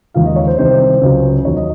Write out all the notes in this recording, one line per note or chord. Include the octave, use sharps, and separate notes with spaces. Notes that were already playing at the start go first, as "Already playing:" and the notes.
D#2 C#3 F3 G#3 F5
D#5
C#5
C5
C2 C3 D#3 C5
C#2 C#3 F#3
D#2 D#3 F#3 C#5
D#5